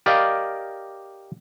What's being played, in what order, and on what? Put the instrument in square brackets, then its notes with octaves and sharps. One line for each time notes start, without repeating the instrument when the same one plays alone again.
[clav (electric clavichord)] G4 A#4 D5 D#5 F5